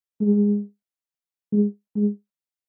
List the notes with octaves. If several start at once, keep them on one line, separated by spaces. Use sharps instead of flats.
G#3
G#3
G#3